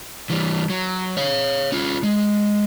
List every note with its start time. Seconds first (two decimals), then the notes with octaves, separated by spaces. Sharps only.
0.30 E3 G3
0.70 F#3
1.17 C#5 F5
1.72 C#4 F4
2.03 G#3